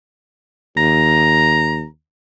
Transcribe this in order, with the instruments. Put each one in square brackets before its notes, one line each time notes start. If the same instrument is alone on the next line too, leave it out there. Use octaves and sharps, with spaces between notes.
[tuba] D#2 [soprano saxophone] A#5